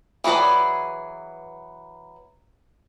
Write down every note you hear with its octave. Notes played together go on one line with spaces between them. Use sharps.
E3 F#3 G#4 B4 D5